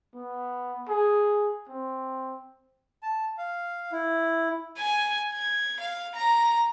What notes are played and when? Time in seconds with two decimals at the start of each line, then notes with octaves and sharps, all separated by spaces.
0.14 B3
0.89 G#4
1.69 C4
3.03 A5
3.38 F5
3.92 E4
4.78 G#5
5.33 G#6
5.80 F5
6.15 A#5